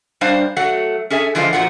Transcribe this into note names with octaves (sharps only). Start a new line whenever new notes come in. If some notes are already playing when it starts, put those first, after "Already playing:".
F#2 G3 D4 C5 F5
F#3 A3 F#5
C#4 G#4 A4 E5 G#5
D3 E3 F3 G#3 A#4 F5
A#2 E3 F3 F#4 F#5